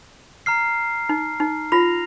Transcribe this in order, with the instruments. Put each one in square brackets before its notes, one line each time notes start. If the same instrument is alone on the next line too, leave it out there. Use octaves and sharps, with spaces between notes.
[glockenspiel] A#5 F6 C7
[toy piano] D#4
D#4
[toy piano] F4 [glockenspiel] F6 A#6 F7